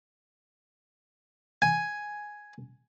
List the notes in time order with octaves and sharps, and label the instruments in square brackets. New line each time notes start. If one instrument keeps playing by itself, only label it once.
[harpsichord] G#5